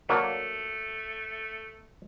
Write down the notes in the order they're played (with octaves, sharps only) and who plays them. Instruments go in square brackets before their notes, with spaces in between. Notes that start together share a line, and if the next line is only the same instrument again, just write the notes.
[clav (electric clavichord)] F#3 A#3 D4 [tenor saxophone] A3